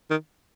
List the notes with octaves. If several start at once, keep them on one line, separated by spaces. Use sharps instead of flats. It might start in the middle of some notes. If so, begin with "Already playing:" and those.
D#3